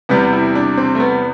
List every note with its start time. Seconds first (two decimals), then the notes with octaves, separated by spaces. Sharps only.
0.09 E2 C3 G3 B3
0.33 E4
0.55 D4
0.77 C4
0.95 A3
1.00 B3